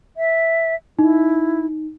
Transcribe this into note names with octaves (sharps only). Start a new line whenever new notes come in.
E5
D#4 E4